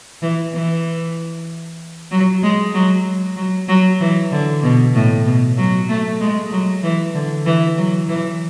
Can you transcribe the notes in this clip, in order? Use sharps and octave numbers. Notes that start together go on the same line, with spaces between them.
E3
E3
F#3
G#3
F#3
F#3
F#3
E3
D3
B2
A2
B2
F#3
A3
G#3
F#3
E3
D3
E3
F#3
E3